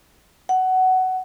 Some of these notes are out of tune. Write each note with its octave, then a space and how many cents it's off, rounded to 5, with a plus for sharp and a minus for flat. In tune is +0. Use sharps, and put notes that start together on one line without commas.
F#5 +15